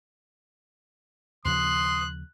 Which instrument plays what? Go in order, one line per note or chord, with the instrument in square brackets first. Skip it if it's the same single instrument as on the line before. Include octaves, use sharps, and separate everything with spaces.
[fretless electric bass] D#2 C#3 F3 [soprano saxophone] C6 [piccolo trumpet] D#6 [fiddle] F#6